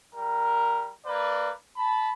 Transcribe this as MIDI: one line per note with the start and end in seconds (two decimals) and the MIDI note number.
0.15 0.92 55
0.15 0.92 70
1.06 1.51 58
1.06 1.51 71
1.06 1.51 74
1.77 2.11 81
1.77 2.11 83